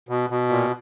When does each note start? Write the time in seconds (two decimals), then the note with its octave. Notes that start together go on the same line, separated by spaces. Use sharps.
0.09 B2
0.30 B2
0.49 A#2